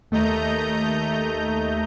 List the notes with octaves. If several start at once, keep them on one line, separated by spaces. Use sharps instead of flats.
D#2 A3 D#5 A#5 G6